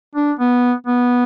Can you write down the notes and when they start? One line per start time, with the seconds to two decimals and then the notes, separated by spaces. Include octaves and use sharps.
0.15 D4
0.39 B3
0.87 B3